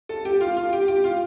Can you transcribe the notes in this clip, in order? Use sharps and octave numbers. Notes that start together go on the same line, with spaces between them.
A4
G4
F4
F4
G4
G4
F4